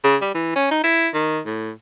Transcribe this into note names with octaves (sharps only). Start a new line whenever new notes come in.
C#3
G3
E3
C#4
D#4
E4
D#3
A2